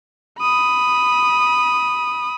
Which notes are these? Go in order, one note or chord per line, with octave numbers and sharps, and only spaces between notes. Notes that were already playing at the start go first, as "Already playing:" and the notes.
B5 D#6